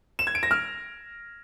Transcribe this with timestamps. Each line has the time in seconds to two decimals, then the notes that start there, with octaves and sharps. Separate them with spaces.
0.19 E7
0.27 G#6
0.35 D7
0.43 A#6
0.51 F6